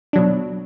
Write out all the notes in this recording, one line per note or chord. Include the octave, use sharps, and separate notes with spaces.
B2 F#3 D4